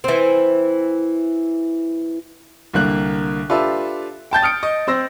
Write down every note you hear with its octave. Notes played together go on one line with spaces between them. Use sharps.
E3 C4
C2 D3 A#3 F#6
D4 F4 G4 A4 B4 E5
G5 A5 G6 A6
D#6 F6 C#7 D7
D#5
C4 C5 E6 A#6